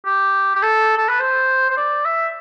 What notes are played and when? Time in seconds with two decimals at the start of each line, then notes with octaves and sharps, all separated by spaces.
0.06 G4
0.56 G4
0.63 A4
0.98 A4
1.09 B4
1.20 C5
1.70 C5
1.77 D5
2.06 E5